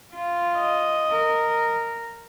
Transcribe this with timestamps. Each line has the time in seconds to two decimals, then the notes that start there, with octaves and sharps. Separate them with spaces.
0.13 F4
0.57 D#5
1.12 A#4